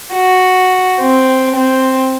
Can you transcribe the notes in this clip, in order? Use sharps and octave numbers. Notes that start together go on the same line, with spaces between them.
F#4
C4
C4